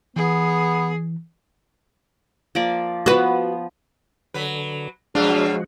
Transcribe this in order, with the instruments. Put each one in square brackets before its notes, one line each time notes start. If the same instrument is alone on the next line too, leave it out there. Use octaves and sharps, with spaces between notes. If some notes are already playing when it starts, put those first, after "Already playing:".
[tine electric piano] E3 [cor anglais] B3 [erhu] G#4
[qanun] F3 A#3 D5
[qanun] F3 B3 [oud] F#4 B4
[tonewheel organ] D3 [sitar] F#3 B4
[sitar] B2 F#3 F4 [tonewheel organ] F3 G#3 F#4 [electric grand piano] D4 [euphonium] G#4